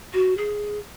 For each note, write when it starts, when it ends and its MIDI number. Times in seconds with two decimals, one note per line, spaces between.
0.13 0.36 66
0.37 0.78 68